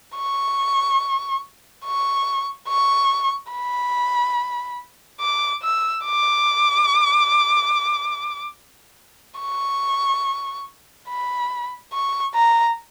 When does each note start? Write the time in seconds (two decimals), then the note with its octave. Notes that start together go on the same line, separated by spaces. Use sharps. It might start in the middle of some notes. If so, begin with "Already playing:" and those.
0.16 C#6
1.85 C#6
2.69 C#6
3.52 B5
5.21 D6
5.62 E6
6.05 D6
9.40 C#6
11.08 B5
11.93 C#6
12.34 A#5